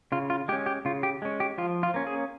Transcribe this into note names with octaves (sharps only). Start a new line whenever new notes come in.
C#3 F4
F4
G#3 C#4 G4
G4
C#3 F4
G4
G#3 C#4
G4
F3 F4
F4
A#3 C#4
G#4